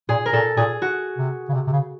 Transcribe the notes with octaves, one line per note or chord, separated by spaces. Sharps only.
A#2 G#4
A#4
A#2 A4
A#2 G#4
F#4
C3
C#3
C3
C3
C#3